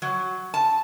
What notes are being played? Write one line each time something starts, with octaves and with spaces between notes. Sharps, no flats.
F#3
A5